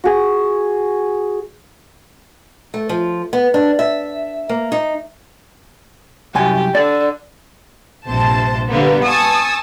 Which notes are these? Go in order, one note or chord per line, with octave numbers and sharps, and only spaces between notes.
F#4 G#4
A3
F3
B3
D4
E5
A#3
D#4
C2 F#2 G4 G#5
D3 D5
A#1 G2 C3 C5 A5
D3 G3 A#3 B3
G#5 A5 C#6 D#6 E6